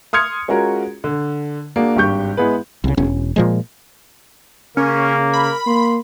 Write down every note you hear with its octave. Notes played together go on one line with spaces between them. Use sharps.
C6 D#6 F6 G#6 C#7
G#3 C#4 F4 F#4 A#4
D3
A#3 D4 F#4 G#4
G#1 G2 G4 C#6 G6
G#3 B3 E4 G#4 B4
C2 C#3
E1 C#4
A#2 F3 G#3
C#3 A#3 C#4 A#4
B5
A#3 C6